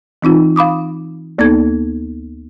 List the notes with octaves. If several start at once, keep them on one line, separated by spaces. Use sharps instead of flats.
E3 C4 D#4 F4
F5 B5 D6 D#6
D2 A#3 B3 D#4 A4 G#6